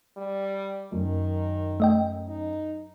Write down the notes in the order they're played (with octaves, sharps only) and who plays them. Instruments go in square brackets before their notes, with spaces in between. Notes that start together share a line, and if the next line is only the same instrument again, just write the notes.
[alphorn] G3
[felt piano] F#2 [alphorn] D#3
[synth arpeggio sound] A3 D#5 G5
[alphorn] D#4